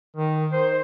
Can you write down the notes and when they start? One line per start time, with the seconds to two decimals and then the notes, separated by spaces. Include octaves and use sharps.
0.16 D#3
0.53 C5